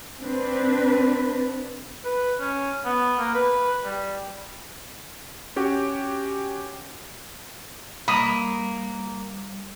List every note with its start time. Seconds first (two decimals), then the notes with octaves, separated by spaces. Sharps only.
0.20 C4 D4 B4
2.05 B4
2.40 C#4
2.85 B3
3.19 A#3
3.35 B4
3.85 G3
5.56 C#4 F#4 G4
8.08 G3 A#3 B5 D#6